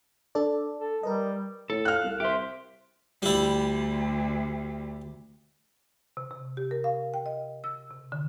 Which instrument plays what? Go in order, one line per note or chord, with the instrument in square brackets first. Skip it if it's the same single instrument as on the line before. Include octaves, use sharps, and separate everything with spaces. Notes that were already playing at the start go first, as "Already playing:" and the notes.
[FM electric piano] D4 A4 D5
[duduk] A4
[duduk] G3 [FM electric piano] A#4 B4 D#5
[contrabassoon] A2 [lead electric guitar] A4
[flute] F5 [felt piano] F6 F#6
[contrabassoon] C2
[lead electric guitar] G4 C5 [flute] E5
[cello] D2 [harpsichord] G3 E4
[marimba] C3
C3
G4
A#4
F5
G5
D#5
E6
C3
D3